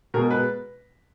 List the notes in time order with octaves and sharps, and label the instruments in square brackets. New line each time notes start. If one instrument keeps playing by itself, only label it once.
[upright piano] B2 G#3 A#4
B4